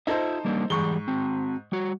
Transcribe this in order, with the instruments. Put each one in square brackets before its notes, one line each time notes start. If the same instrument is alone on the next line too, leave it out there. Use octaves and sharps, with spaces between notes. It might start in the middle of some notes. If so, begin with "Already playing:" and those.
[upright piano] D#4 A4 C5 [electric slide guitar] F4 D#5 E5
[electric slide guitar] G3 A#3 D4
[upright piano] G#2 C#6 G7 [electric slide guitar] E3 G3 G#4
[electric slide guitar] C4 F#4
G3 F#4